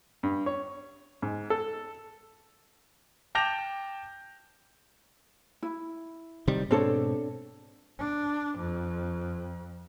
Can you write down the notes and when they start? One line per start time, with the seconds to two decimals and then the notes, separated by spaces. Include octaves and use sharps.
0.23 G2
0.46 C#5
1.22 G#2
1.50 A4
3.35 G5 A5 D6 G6 A#6 F7
5.63 E4
6.48 C3 D#3 G3
6.71 G#2 B2 C4 D4 A4 C#5
7.99 D4
8.58 F2